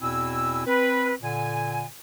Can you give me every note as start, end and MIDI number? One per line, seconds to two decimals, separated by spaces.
0.02 0.63 40
0.02 0.63 47
0.02 0.63 60
0.02 0.63 64
0.02 0.63 80
0.02 0.63 88
0.67 1.14 60
0.67 1.14 71
1.22 1.85 46
1.22 1.85 50
1.22 1.85 80